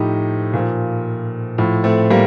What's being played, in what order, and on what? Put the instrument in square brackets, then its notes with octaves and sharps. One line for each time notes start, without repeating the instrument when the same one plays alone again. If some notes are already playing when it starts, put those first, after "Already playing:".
Already playing: [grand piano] A2 F3 D#4 G4
A#2 F3
A2 F3
A3 C4
G3 A#3